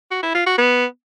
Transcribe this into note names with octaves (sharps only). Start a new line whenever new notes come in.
F#4
E4
F4
F#4
B3